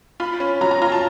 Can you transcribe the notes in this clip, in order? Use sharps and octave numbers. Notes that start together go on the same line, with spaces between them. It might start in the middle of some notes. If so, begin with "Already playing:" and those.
F4 B5
C#4
F#3 A#5
A#5
F4 A#5
A5